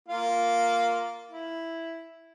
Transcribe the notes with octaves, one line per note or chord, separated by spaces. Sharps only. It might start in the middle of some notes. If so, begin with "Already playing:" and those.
A#3 F4 F5
E4